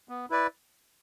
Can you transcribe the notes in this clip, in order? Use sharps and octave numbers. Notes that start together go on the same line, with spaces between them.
B3
E4 B4 D5